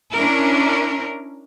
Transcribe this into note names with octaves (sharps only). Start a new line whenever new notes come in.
C#4 D4 E4 A#4